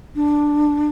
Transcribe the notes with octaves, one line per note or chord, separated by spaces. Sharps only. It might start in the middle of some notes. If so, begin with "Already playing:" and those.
D4